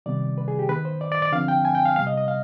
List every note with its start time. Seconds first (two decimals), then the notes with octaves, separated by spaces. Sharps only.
0.06 C3 D#3 G3 B3 D5
0.38 B4
0.48 G#4
0.59 G4
0.69 D#3 B3 B4
0.85 C5
1.01 D5
1.12 D5
1.22 D5
1.32 D3 F3 C4 F5
1.48 G5
1.65 G#5
1.75 G5
1.86 F5
1.96 C3 G3 B3 F5
2.07 D#5
2.18 D#5
2.28 F5